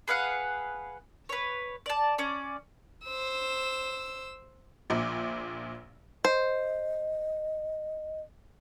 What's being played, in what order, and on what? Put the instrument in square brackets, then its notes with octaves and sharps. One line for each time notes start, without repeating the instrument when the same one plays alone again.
[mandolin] G#4 B4 F5 F#5
B4 C#5
D5 A5
C#4 D5
[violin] C5 E6
[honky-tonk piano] A#1 A#2
[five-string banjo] C5 [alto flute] D#5